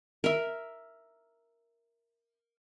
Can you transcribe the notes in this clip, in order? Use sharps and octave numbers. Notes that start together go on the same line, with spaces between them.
A#4 E5